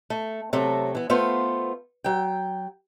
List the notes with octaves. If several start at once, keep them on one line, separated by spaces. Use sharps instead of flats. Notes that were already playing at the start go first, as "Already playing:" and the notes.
A3
C3 F#3 A3 A4
E3 B3
A3 B3 F4 C5
F#3 G5